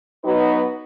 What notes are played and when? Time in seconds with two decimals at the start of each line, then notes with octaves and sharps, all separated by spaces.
0.23 F#3 B3 D#4 F#4 B4